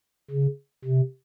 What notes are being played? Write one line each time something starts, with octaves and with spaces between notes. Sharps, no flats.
C#3
C3